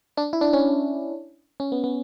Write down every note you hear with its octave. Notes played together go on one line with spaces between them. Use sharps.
D4
E4
D4
C#4
C#4
B3
B3